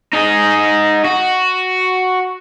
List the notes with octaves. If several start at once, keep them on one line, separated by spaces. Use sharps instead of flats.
D#4 G#4
F#4